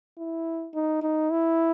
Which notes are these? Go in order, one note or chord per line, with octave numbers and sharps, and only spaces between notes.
E4
D#4
D#4
E4